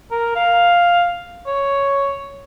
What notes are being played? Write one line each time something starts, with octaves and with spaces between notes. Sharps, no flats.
A#4
F5
C#5